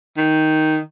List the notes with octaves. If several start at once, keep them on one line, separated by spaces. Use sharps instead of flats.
D#3